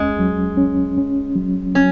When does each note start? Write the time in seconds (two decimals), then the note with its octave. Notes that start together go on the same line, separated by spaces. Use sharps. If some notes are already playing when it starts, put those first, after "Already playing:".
Already playing: D#2 G#3 C#4
0.19 F#3
0.57 C#4
0.98 C#4
1.36 F#3
1.75 F#3 C#4